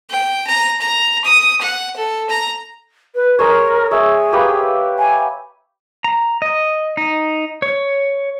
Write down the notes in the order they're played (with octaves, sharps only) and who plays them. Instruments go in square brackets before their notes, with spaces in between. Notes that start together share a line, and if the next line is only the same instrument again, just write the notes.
[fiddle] G5
A#5
A#5
D#6
F#5
A4
A#5
[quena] B4
[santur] G#3 C#5 [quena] A#4
[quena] G#4 [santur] C#5 E5
[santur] A#3 G4 B4
[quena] G#5
[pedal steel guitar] A#5
D#5
D#4
C#5